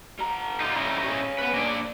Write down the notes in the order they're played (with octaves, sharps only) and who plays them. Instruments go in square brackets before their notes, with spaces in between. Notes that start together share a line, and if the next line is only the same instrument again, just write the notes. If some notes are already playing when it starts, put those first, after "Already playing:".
[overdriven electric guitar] G3 A#5
[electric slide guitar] D#4 F4
C#4 D#4 E4
[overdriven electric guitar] G#4 C#5
[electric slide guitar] B3 B4
A#3 D4 D5